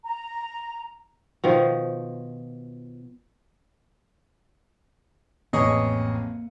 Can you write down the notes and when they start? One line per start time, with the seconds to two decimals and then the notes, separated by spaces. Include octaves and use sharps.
0.05 A#5
1.44 B2 D#3 F3
5.53 A1 F2 A#3 G#4 C#5 D#5